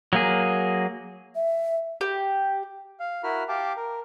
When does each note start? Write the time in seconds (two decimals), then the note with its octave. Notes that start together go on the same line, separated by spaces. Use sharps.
0.13 F#3 A#3 G#4
1.35 E5
2.01 G4
3.00 F5
3.23 E4 F#4 A#4 B5 F6
3.48 G4 F5 G5 A5 D6
3.76 A#4